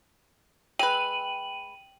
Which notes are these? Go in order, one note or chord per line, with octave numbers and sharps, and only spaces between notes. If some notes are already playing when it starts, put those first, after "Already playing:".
G#3 B4 G5 D#7 F#7